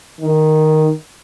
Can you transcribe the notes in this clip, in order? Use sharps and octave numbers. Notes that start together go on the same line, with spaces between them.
D#3